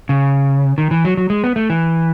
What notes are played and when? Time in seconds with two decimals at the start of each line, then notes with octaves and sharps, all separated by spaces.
0.09 C#3
0.78 D#3
0.91 E3
1.05 F#3
1.17 F#3
1.30 G#3
1.44 B3
1.56 A3
1.70 E3